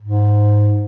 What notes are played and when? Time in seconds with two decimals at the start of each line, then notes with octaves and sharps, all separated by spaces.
0.02 G#2